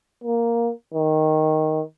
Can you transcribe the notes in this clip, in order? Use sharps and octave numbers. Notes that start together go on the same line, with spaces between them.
A#3
D#3